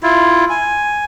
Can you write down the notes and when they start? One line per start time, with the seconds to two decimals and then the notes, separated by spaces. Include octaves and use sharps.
0.03 E4 F4
0.50 G#5